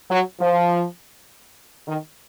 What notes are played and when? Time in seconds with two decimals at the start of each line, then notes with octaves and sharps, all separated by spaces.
0.11 F#3
0.40 F3
1.88 D#3